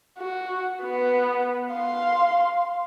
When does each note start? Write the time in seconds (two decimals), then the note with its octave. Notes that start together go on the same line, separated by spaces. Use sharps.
0.19 F#4
0.83 B3
1.72 F5 C6